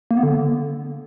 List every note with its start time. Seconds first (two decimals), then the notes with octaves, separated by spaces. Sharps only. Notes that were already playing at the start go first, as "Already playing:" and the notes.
0.11 A#3
0.17 B3
0.23 D3